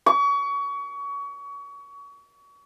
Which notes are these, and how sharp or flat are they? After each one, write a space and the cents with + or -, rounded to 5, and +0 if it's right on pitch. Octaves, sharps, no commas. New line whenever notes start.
C#6 +30